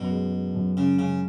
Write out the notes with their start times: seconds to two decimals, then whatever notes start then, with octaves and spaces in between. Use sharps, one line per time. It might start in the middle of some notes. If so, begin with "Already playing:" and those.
Already playing: F#2 B2
0.10 G#3
0.32 G#3
0.54 F#2
0.77 C#3 G#3
0.99 C#3 G#3